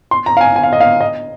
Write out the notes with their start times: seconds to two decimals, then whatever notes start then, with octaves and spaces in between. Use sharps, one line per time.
0.11 C6
0.26 A#5
0.37 F5
0.41 G#5
0.56 G#5
0.63 F5
0.73 D#5
0.80 F5
1.01 D#5